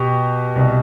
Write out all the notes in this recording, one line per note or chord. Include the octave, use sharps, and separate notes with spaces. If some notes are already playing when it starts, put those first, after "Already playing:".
Already playing: B2 G4
C2 B2